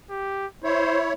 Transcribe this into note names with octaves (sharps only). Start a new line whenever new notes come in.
G4
E4 C5 C#5